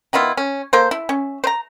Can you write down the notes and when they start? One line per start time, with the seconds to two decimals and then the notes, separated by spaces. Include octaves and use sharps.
0.13 D#3 B3 E4 F4
0.37 C#4
0.73 A#3 A4 C5
0.91 E4
1.09 C#4
1.44 C5 A#5